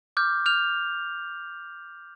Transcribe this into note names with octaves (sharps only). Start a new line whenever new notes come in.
D6 F6 G6
F6 G6 F7